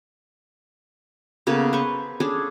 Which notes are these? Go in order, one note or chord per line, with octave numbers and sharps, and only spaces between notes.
C#3 A#3 B3 A4
B4 C5 C#6
C#4 D4 G#4 A4